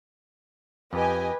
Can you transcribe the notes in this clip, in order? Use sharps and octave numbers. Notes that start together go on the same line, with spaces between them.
F2 G4 B4 D#5 G#5